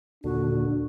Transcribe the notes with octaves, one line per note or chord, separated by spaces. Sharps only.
D#2 A#2 D3 D4 F#4